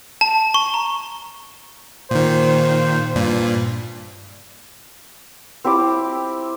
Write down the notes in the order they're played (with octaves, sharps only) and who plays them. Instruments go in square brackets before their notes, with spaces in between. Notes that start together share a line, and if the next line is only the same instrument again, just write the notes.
[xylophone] A5
C#6
A#5
[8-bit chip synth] A#2 D#3 [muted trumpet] C5
[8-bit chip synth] G2 A#2
[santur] C4 E4 G4 D6